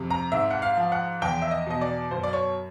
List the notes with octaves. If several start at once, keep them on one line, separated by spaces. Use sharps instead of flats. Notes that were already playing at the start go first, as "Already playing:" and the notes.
Already playing: F2 C3
A#5
G#2 E5
F#5
F5
F3
F#5
E2 G5
E5
D#5
B2 D#5
D5
F#2 C5
D5
C#5